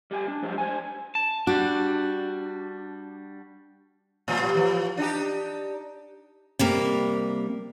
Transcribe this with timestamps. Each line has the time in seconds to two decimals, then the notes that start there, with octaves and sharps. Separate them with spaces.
0.11 G3 G4 G#5
0.28 D4
0.42 F3 F#3 G#3 G4 C5
0.58 D4 C5 G#5
1.15 A5
1.47 G3 D4 F#4
4.28 A2 F3 G3
4.54 E3 F3
4.97 D4 D#4 G4
6.59 C3 G3 A#3